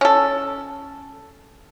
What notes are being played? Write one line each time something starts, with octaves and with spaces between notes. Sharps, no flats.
C#4 A4